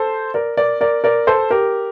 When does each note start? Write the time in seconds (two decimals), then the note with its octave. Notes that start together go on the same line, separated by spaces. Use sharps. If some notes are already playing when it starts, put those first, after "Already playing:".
Already playing: A4 C5
0.34 A#4 D5
0.57 A#4 D5
0.81 A#4 D5
1.04 A#4 D5
1.27 A4 C5
1.51 G4 A#4